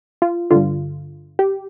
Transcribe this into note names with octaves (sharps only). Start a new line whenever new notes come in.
F4
G2 D3 F4
G4